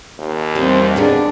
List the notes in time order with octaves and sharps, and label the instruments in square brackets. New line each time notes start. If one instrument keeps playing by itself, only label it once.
[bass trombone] D#2
[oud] E2 G3 [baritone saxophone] C4
[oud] D2 B3 G#4 [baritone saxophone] D4